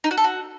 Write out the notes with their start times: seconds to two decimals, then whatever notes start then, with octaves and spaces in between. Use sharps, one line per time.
0.04 D#4
0.11 F#4
0.17 A4
0.24 F#4